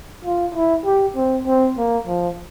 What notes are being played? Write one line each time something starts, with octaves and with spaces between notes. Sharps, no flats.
F4
E4
G4
C4
C4
A#3
F3